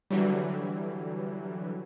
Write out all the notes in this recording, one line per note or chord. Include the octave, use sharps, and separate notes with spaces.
D3 E3 F#3 G3